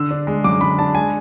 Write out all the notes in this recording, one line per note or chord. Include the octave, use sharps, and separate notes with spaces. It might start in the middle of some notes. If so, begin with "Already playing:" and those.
Already playing: D3 E6
D4
G#3
F#2 D6
D3 B5
D4 A5
G#3 G#5